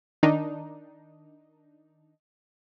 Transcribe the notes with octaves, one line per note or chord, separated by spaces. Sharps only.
D#3 D4 D#4